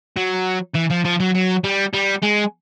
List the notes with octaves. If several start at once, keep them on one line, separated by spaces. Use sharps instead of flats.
F#3
E3
F3
F3
F#3
F#3
G3
G3
G#3